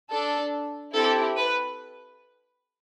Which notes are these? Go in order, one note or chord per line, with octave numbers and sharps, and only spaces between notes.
D4 A4
C4 E4 G4 A4
B4